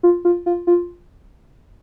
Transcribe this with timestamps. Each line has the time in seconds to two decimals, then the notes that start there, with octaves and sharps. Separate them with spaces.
0.03 F4
0.25 F4
0.46 F4
0.67 F4